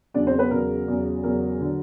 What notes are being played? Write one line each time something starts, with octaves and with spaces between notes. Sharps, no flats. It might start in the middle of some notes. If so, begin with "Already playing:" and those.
E2 C#3 F#3 D4 D5
C4 C5
B3 B4
E2 C#3 F#3 A#4
E2 C#3 F#3
E2 C#3 F#3 A#4
D3 F#3